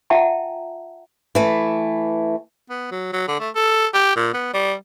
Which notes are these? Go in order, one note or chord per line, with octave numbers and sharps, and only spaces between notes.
F4 E5 F#5 G5 A5 A#5
E3 A3
B3
F#3
F#3
D3
A3
A4
G4
A#2
B3
G3